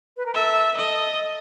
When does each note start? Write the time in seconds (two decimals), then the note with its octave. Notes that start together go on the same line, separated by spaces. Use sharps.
0.17 B4
0.26 A#4
0.34 A4 E5
0.77 A4 D#5